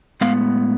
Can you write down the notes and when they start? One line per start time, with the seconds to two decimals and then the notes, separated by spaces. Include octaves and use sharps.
0.21 A2 G#3 B3 F5